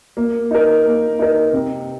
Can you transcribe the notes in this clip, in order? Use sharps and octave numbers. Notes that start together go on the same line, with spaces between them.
A#3
D#4 A#4
A#3
D#4 A#4
C3